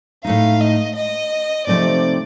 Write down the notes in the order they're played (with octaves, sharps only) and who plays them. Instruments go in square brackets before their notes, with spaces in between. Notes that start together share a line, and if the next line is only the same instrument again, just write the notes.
[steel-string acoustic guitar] A2 A3 D#4 [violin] F5
[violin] D#5
D#5
[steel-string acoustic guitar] C3 F3 A3 C4 D#4 [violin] D5